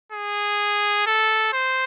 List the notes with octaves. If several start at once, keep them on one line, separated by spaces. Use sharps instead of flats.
G#4
A4
C5